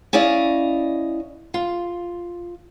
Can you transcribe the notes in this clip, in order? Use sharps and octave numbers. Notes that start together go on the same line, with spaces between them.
C#4 E4 D5 D#5 F5
F4